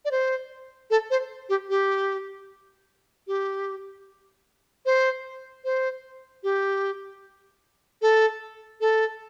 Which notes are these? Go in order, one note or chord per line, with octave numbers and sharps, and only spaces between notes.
D5
C5
A4
C5
G4
G4
G4
C5
C5
G4
A4
A4